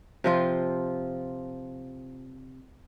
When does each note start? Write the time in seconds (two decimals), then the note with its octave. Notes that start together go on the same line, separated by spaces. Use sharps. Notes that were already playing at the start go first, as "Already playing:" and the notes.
0.24 C3 F3 F4